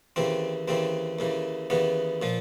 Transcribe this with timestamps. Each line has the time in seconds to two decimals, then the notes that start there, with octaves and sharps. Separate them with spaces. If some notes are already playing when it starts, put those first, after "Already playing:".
0.16 D#2 C#3 E3 C4
0.68 D#2 C#3 E3 C4
1.19 D#2 C#3 E3
1.70 D#2 C#3 E3 B3
2.22 A#2 F3